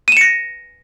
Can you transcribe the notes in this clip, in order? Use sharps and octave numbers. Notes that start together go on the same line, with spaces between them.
A#6 C#7 D#7 E7